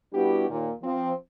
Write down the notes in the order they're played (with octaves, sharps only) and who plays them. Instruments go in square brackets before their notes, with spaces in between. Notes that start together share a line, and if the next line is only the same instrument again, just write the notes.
[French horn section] G3 B3 D4 E4 F#4 G4
D#2 A#2
F3 C4